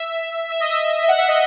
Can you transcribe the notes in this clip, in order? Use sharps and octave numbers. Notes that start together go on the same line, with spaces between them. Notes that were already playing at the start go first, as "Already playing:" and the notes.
Already playing: E5
E5
D#5
E5
E5
F#5
E5
D#5